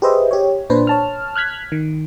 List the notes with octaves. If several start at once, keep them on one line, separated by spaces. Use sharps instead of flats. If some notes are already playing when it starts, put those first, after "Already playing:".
G4 G#4 B4 C5 D#5 E5
G4 C#5
A#2 D4 B4 C5
C#5 A5 F6
F6 F#6 G#6 B6
D#3